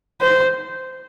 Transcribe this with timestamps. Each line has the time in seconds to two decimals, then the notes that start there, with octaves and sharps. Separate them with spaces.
0.21 C5